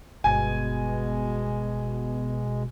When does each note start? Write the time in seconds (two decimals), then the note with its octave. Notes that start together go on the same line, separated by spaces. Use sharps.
0.24 G1 B2 G#3 G#5